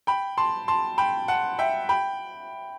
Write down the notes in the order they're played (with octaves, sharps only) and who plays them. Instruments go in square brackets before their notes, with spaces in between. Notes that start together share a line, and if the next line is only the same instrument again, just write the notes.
[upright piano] G5 B5
A5 C6
A5 C6
G5 B5
F#5 A5
E5 G5
G5 B5